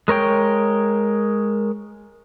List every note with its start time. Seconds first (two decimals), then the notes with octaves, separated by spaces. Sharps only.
0.08 G#3 A#4 C#5 G5